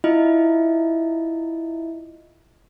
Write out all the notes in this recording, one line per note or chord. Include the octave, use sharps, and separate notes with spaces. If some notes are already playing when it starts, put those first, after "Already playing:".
E4 F4 D#5 E5